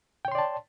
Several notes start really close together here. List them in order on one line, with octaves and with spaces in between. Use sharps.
G5 C#5 C6 D5 A5